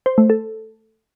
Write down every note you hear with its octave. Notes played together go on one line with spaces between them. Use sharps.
C5
A3
A4